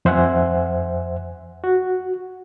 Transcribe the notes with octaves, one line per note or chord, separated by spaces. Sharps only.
F2 C5 E5 F#5 G#5
F#4